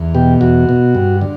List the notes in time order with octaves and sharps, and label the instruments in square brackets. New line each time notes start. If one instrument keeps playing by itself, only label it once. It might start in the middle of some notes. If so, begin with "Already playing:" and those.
Already playing: [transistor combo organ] E2
B2 G4
E2 F#4
B2
G2
D3